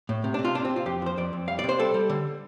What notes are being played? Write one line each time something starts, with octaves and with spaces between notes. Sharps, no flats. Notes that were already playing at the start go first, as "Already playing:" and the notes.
A2
C3
D4
C3
F4
C3 D4
C4
C3
F4
F2 G4
F3 C5
F2 D5
F2
G3 F5
D5
C3 C5
G3 A4
G3
D3